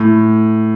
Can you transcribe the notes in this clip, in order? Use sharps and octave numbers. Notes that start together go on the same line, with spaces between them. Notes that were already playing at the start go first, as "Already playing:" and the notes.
Already playing: A2